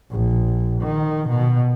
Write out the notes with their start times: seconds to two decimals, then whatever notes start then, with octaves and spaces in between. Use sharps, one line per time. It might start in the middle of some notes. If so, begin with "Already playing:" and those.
0.11 A#1
0.82 D#3
1.28 B2